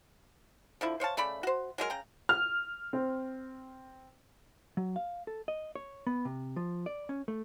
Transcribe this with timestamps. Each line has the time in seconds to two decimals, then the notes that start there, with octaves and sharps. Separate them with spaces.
0.81 D3 F3 E4
1.00 C5 C#5 F5 A5
1.17 C#3 A3 D5 B5
1.43 F#4 C5
1.78 F#3 G#3 A3 A#4
1.90 C#3 G5 A#5
2.29 F6
2.93 C4
4.77 F#3
4.96 F5
5.27 A4
5.48 D#5
5.75 C#5
6.07 B3
6.25 C3
6.56 F3
6.86 D5
7.09 C#4
7.28 A3